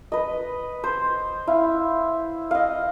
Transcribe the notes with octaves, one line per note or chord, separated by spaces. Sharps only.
B4 D#5
C5
E4 F5
D#5 F5